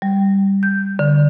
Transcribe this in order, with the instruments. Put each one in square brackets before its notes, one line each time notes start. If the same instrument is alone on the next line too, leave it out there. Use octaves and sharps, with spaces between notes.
[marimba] G3
G6
D3